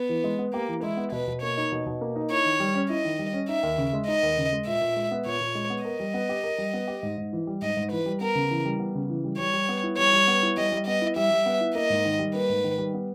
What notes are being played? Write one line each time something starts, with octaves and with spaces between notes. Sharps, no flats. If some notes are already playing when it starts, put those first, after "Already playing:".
Already playing: B3
E3
G#3
B3
A#3 G4
E3
G#3 E4
B3
B2 B4
B2
A#3 C#5
D#4
B2
B2
A#3
D#4
E4 C#5
D#3
G3
C#4
E4 D#5
D#3
G3
C#4
D#4 E5
D#2
C#3
G#3
D#4 D#5
D#2
C#3
G#3
A#2 E5
A#2
G#3
B3
A#2 C#5
A#2
G#3
B3
A#4 D#5
G3
B3
G4
A#4
G3
B3
G4
G#2
G#2
E3
G3
G#2 D#5
G#2
E3 B4
G3
B3 A#4
C#3
E3
G3
B3
C#3
E3
G3
G3 C#5
G3
B3
E4
G3 C#5
G3
B3
E4
G3 D#5
G3
B3 D#5
E4
G3 E5
G3
B3
E4
A#3 D#5
G#2
D#3
G3
A#3 B4
G#2
D#3
G3
B3